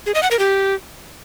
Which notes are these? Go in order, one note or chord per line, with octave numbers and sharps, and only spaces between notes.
G#4
D#5
F#5
A#4
G4